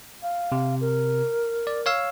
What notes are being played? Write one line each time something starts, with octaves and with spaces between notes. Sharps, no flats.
F5
C3
A#4
D5
C#5 F5 E6